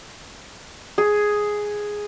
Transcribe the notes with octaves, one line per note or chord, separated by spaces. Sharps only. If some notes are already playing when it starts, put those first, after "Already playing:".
G#4